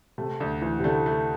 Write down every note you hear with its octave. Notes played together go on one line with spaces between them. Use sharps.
C3 A3
D2 D3
D2 E3
C3
D3 A3
A3